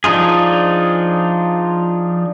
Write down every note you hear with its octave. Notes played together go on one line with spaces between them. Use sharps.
F3 D4 D#4 F4 G#4